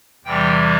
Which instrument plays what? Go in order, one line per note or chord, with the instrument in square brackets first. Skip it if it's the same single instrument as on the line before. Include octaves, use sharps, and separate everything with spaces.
[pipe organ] E2 C3 E3 G3 G5